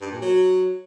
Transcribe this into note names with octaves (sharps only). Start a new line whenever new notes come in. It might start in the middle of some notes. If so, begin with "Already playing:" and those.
G2
A#2
F#3